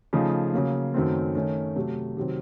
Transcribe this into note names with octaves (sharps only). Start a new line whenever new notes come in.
C#3 F3 A3 D#4
C#3 F#3 A#3
F#2 D#3 F#3 A3 C4
D#3 A3 C#4
C3 F#3 A3
C3 D#3 F#3 C4